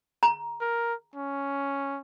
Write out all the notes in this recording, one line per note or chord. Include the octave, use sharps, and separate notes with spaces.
A#5
A#4
C#4